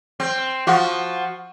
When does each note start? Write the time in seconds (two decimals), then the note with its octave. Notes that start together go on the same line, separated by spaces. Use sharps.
0.20 C4
0.67 F3 F#4